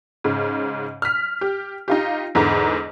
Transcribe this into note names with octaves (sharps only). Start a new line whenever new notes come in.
G#2 C#3
F6 B6
G4
D#4 F4 G4
E2 G#2 D3 A#5 B5